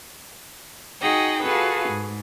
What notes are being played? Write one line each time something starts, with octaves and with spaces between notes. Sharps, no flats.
D#4 F#4 G#4 D#5 F#5 G5
F4 F#4 G#4 A4 B4
G#2